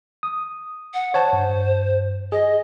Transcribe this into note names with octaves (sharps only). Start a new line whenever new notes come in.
D#6
F#5
C5 C#5 F#5 A5
G2
G#4 D#5